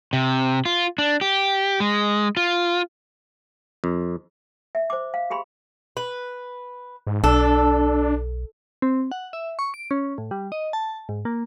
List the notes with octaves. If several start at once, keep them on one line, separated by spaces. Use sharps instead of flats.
C3
F4
D4
G4
G#3
F4
F2
E5
C5 D6
F5
G4 G#4 B5 C6
B4
G#2
B1 D4 A4
C4
F#5
E5
C#6
D7
C#4
A2
G3
D#5
A5
G#2
A#3